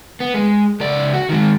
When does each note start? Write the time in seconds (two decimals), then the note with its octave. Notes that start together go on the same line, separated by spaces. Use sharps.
0.20 B3
0.34 G#3
0.80 C#2 D5
1.13 F#4
1.29 D#3 G#3